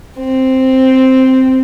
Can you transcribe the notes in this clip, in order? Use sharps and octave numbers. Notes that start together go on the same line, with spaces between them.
C4